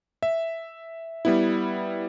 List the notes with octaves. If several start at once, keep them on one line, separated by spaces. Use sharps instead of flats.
E5
G3 B3 E4